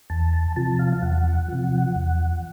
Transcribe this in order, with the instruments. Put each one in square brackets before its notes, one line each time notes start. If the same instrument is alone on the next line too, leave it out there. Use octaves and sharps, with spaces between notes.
[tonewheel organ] E2 A5
A5
C3 F3 A5
F5
F5
E2 F#5
C3 F3
E2